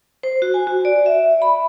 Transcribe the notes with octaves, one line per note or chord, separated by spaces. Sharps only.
C5
F#4
G#5
F#4
D5
E5
B5